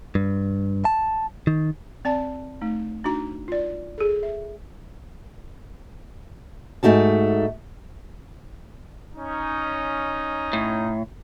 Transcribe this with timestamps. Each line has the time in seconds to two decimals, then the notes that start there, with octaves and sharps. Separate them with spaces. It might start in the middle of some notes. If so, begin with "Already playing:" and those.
0.15 G2
0.85 A5
1.47 D#3
2.05 C4 D5 A5
2.61 A3 D#4
3.04 D4 D#4 F#4 A#5
3.48 F4 D5
3.98 G#4 A4
4.23 E5
6.83 G#2 A3 D#4 F#4 A5
9.16 C#4 D#4
10.53 A2